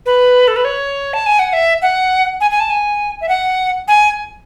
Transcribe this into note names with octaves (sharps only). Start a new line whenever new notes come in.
B4
A4
B4
C#5
A5
G#5
F#5
E5
F#5
G#5
G#5
A5
G#5
E5
F#5
G#5